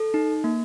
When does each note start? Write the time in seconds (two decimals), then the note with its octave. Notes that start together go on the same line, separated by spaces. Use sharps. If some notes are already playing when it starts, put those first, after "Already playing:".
Already playing: A4
0.14 D#4
0.44 A#3